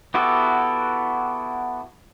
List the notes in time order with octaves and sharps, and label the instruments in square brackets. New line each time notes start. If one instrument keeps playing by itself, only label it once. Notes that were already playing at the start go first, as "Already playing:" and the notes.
[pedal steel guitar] B3 E4 F#4 G4 A4